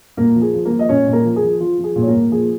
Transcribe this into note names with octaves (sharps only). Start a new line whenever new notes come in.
A#2 A#3 A#4
F3
G#4
F3
A#3 A#4
F3
D#5
A#2 C#4 C#5
A#2
A#3 A#4
F3
G#4
F3
F3 F4
F3
G#4
A#2
C#5
A#3 A#4
A#2
F3 G#4